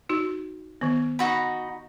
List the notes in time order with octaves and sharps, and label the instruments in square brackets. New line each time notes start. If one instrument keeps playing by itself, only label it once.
[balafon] D#4 F#4
D#3 B3
[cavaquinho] D#4 F#4 B5